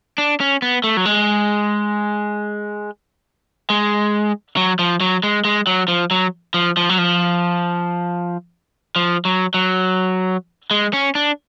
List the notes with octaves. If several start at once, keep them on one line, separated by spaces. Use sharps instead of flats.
D4
C#4
B3
A3
F#3
G#3
G#3
F#3
F3
F#3
G#3
G#3
F#3
F3
F#3
F3
F3
F#3
F3
F3
F#3
F#3
G#3
C#4
D4